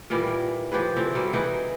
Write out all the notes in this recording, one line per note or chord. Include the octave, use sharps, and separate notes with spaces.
A#2 D#3 E3 G3
F3 G4 G#4 B4
D3 E3 C4
F#3 G3
E3 D#4 G#4 F#5